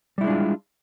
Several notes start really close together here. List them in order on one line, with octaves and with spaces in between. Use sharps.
G3 E4 G#3 D4 F4